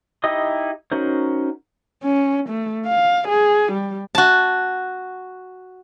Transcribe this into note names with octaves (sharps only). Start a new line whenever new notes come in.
D#4 E4 G4 D#5 D#6
C#4 D#4 F#4 A#4 C5
C#4
A3
F5
G#4
G3
F#4 A5